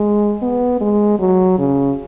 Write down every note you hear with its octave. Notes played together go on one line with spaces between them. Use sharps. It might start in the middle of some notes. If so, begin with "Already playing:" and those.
Already playing: G#3
B3
G#3
F#3
C#3